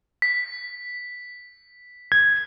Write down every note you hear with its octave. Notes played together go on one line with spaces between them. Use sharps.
B6
G#6